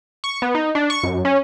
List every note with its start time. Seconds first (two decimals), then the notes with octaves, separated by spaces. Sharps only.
0.24 C#6
0.42 B3
0.55 D#4
0.75 D4
0.90 C#6
1.03 F#2
1.25 C#4